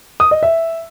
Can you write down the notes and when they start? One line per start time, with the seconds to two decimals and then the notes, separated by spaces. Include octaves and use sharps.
0.20 D#6
0.31 D#5
0.43 E5